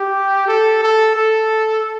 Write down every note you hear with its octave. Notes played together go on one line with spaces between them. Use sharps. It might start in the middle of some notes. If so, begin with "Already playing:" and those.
Already playing: G4
A4
A4
A4